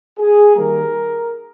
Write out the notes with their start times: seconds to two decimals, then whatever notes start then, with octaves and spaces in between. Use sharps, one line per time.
0.19 G#4
0.56 D#3 G3 A#3 A#4